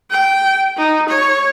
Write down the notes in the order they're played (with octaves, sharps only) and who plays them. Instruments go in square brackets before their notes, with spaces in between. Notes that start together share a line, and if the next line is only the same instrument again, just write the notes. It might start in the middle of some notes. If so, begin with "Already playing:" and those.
[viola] G5
D#4
C#5